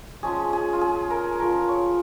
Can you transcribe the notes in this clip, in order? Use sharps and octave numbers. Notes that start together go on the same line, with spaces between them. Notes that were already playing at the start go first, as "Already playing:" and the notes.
F3 G#3 C#4 G#4
G#4
F4
G#4
A#4
F3 C#4 F4 A#4
C#5